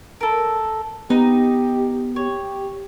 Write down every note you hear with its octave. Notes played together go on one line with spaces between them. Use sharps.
A4 A#4
B3 D#4 G4
G4 C#5